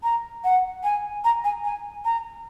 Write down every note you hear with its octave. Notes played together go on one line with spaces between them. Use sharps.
A#5
F#5
G#5
A#5
G#5
G#5
A#5